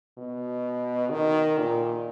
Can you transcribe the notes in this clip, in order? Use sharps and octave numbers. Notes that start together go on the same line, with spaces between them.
B2
D#3
A#2